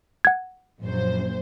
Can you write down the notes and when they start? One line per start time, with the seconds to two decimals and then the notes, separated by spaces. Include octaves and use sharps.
0.25 F#5 G#6
0.81 A#1 F#2 C5